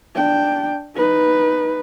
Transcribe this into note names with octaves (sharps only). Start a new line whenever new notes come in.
D4 G5
D#4 B4